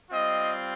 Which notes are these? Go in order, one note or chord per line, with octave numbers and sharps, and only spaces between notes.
G3 C4 F4 D#5